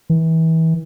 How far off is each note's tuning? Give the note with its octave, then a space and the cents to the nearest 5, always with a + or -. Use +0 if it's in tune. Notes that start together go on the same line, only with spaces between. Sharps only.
E3 -30